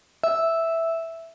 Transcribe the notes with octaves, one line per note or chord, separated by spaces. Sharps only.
E5